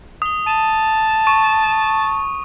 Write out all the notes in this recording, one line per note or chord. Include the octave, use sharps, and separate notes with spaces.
D#6 G7
A5 D#7
C#6